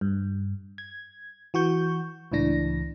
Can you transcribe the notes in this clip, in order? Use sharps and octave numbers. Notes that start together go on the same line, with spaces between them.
G2
G#6
E3 F#4 C#6 G6
C#2 A2 E3 D4 A#6